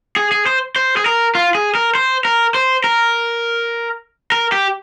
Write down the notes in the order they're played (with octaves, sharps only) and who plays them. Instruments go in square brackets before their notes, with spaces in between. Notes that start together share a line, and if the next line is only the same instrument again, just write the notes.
[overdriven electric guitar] G#4
G#4
C5
C5
G#4
A#4
F4
G#4
A#4
C5
A#4
C5
A#4
A#4
G4